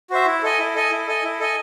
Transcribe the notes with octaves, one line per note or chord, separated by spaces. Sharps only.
F#4 C5 E5
E4
A4 D#5 G#5
E4
A4 D#5 G#5
E4
A4 D#5 G#5
E4
A4 D#5 G#5